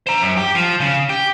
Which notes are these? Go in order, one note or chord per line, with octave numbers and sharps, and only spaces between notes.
C5 A#5
F#2
G4
F3
C#3
G4